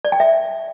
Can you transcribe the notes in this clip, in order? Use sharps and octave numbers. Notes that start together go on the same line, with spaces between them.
D5
G5
E5